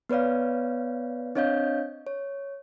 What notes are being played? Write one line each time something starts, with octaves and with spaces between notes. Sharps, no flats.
B3 B4 C#5 D5 F5
C4 D4 C#5 D#5 F5 G6
C#5